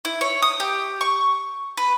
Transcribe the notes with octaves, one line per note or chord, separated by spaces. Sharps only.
E4
C#5
D#6
G4
C#6
B4